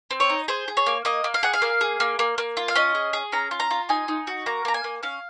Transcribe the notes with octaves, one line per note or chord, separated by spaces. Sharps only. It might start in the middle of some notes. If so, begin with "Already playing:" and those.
C4
C#5
D#4
G#4 C5
G#4
C#5
A#3
A#3 D#5
A#3
F5
G#4 F#5
F5
A#3
G#4
A#3
A#3
A#3
F4
F5
C#4 D#5
G#4
G#4
C#4 A#5
F4
A#5
F4
D#4 G#5
D#4
F#4
A#3 A#5
A#3 A#5
G#5
A#3
C#4 F5